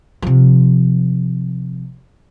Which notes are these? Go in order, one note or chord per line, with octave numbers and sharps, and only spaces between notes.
C3 F3